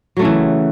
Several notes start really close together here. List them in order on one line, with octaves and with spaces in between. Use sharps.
F#3 A3 C#3 E3